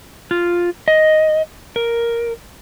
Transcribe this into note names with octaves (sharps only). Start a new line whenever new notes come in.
F4
D#5
A#4